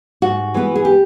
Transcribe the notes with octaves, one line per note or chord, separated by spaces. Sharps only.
G#2 F#4
E3 G#3 B3
G#4
G4